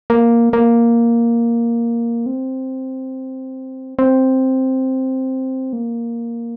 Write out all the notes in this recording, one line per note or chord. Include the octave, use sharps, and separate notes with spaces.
A#3
A#3
C4
C4
A#3